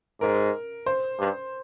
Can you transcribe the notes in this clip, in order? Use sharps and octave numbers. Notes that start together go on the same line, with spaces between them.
G#2 A#4
C5
G2